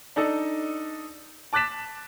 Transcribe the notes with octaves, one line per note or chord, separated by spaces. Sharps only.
D4 D#4 A4 D#5
A5 D6 F#6 A6 B6 E7